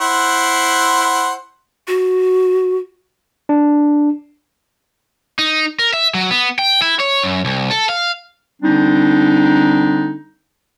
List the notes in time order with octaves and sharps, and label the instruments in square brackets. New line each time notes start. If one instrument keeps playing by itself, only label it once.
[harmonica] E4 C5 F#5
[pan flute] F#4
[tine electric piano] D4
[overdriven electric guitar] D#4
A#4
E5
F#3
B3
G5
E4
C#5
F#2
C2
A4
F5
[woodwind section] D3 G3 C4 D4 D#4